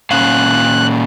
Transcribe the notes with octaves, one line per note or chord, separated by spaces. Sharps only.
A#2 C#4 F5 F#6